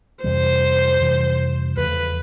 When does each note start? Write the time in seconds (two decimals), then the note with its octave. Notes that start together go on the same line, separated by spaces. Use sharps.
0.24 F2 C3 E3 G3 C5
1.00 F2 C3 E3 G3
1.77 E2 C#3 F3 A3 B4